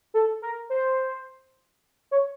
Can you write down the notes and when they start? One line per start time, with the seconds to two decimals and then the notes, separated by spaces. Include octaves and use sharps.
0.14 A4
0.42 A#4
0.70 C5
2.11 C#5